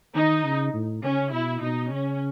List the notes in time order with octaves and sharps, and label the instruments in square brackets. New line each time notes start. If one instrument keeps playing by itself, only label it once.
[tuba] D#3 [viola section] D#4
[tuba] C#3
A2
[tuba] C#3 [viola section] C#4
[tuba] B2 [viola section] E4
[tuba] B2 [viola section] D#4
[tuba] C#3 [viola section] C#4